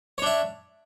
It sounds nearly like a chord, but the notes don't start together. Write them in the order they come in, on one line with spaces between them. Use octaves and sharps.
C#5 D4 E5